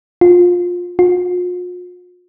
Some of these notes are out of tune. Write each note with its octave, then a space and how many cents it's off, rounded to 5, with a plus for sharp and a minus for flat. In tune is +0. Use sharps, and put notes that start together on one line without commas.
F4 +20
F4 +45